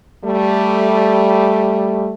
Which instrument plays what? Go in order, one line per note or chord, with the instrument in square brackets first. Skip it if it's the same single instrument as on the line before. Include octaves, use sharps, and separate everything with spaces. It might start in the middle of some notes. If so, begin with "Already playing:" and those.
[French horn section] G3 A3